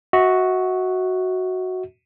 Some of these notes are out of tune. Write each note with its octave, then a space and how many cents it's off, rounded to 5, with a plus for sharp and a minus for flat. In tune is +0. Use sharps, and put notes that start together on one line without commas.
F#4 +0 E5 -40